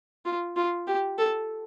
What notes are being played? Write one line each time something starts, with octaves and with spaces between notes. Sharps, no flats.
F4
F4
G4
A4